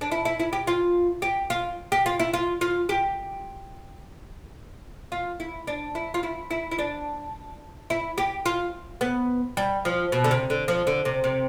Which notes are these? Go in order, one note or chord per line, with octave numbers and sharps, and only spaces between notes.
D4
E4
E4
E4
G4
F4
G4
F4
G4
F4
E4
F4
F4
G4
F4
E4
D4
E4
F4
E4
E4
E4
D4
E4
G4
F4
B3
G3
F3
B2
D3
C3
D3
F3
D3
C3
C3